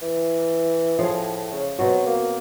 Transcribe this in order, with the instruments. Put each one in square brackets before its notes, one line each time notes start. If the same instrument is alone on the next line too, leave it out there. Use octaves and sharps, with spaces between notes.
[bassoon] E3
[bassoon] A2 [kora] F3 G#4
[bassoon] C#3
[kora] B2 C4 F#4 [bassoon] F#3
[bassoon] A#3